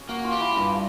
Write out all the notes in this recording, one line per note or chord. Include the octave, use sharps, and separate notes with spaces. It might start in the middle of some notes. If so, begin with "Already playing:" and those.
Already playing: C#4
A#3 F#4
F4
G4
E4
G2 F4